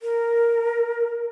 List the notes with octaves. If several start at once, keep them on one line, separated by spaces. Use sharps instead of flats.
A#4